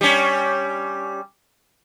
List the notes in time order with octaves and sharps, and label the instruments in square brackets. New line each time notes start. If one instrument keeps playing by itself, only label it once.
[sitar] G3 C#4